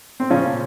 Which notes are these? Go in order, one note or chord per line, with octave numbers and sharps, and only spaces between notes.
C4
C#3 F3 C#4
A#2